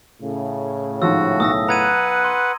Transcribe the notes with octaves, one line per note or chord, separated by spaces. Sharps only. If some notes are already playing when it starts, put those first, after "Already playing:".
A2 C#3
G#2 D#3 F3 F#4 E6
B1 D#6 E6 A#6
B4 F#5 A#5 G#6 D#7
C6